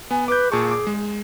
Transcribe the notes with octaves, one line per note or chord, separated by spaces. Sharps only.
B3 G#5
B4 D6 G6
A#2 G#4 A5 C#6
D6
G#3